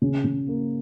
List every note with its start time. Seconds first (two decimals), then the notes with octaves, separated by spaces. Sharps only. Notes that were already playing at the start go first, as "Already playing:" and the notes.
0.02 C#3
0.24 C#3
0.48 A#3